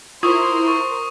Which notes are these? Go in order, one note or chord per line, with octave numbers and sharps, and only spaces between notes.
E4 F4 A#4 C5 C6 C#6 D#6
C#6